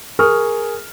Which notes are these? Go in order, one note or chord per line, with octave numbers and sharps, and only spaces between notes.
G#4 A#4 C#6 D#6 F6